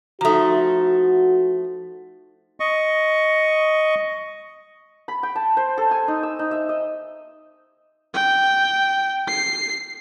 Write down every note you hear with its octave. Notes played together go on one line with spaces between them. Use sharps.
F3 A3 D#4 F#4 A#5
D#5 C#6
B5
G5
A5
C5
A4
G#5
D#4
E6
D#4
E5
D#5
G5
C7